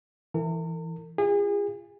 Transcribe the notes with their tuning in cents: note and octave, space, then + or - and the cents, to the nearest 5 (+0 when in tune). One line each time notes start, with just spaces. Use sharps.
E3 +0 A#4 -45
F4 -20 G#4 -35